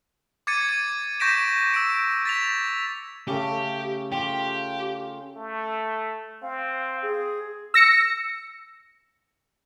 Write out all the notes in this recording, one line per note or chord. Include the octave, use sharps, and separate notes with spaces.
D6 G#6 A6 C#7 D#7
D#7
C#6 G6 A#6 B6 D7 E7
E6 D7
A6 B6 F7
C#3 A3 G4
F4 G4 G5
A3
C4 F5
G#4
E6 A#6 C#7